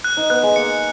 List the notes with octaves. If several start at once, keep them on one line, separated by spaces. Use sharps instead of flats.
F#6
D#4
B3 F#6
G#3
A#3 C#7